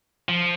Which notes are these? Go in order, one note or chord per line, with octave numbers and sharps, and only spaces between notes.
F3